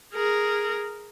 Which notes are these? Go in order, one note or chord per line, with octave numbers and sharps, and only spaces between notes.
G#4 A#4